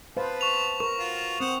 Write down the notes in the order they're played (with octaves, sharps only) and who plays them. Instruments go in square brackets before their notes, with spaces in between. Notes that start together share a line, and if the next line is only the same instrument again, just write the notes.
[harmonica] B3 A5 [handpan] B4 C5 F5
[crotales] C#6 F7
[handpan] A#4 [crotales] C#6
[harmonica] F4 F#4
[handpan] C4 [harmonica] C5 F#5 D#6